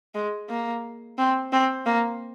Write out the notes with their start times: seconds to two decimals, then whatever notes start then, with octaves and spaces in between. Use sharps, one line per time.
0.15 G#3
0.49 A#3
1.18 C4
1.52 C4
1.86 A#3